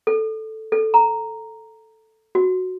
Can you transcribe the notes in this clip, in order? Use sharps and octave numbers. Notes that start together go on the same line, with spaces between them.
A4
A4
A#5
F#4